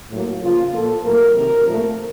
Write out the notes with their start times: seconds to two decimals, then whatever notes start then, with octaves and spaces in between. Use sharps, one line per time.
0.10 A2 F#3 A#3
0.41 C#3 F3 A#3 F4
0.72 A#2 F3 A#3 A4
1.03 A2 F#3 A#3 A#4
1.35 C3 D#3 F#3
1.66 A#2 F3 A3